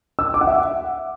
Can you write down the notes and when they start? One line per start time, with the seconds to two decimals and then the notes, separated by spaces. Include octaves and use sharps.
0.19 E6
0.34 D6
0.41 F#5
0.47 E5